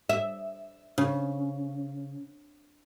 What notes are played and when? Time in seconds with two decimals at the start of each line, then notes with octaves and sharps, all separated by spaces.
0.09 E5
0.98 C#3